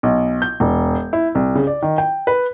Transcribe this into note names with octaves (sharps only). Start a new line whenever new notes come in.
B1
G6
E1
E4
C2
C#3
D5
D#3
G5
B4